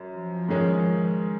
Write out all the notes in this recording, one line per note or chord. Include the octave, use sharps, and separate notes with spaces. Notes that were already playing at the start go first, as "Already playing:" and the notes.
Already playing: F#2
F3
G#2 D#3 G#3 C#4